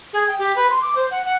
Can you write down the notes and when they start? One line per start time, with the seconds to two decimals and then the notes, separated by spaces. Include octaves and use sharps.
0.13 G#4
0.28 G5
0.39 G4
0.56 B4
0.70 C6
0.82 D6
0.95 C5
1.11 F#5
1.25 F#5